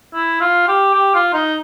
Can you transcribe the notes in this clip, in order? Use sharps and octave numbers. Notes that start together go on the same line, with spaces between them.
E4
F4
G4
G4
F4
D#4